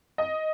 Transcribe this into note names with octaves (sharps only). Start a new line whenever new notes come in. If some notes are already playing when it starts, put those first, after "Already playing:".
D#5